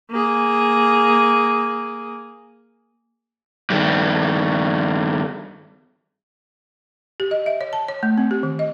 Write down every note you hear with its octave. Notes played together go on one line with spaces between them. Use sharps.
A#3 G#4
G2 D#3
G4
D#5
E5
C#5
A5
C#5
A3
C4
G4
D#3
D#5